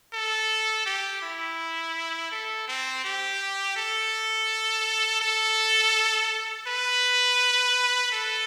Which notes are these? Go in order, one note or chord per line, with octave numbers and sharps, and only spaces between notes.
A4
G4
E4
A4
C4
G4
A4
A4
B4
A4